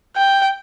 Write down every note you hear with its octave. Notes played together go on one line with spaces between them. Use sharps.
G5